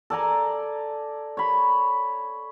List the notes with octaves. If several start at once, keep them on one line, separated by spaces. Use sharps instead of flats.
A4 D5 G#5 A#5
C#5 B5